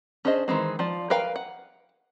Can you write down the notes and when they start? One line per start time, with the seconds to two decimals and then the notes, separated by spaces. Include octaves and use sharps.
0.25 C#4 D4 G#4 C5 D#5
0.48 D#3 E3 G#3 C4
0.79 F3 F4 D5
1.10 A#4 B4 F5 G5
1.36 F#5